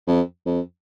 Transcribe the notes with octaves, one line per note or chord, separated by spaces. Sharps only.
F2
F2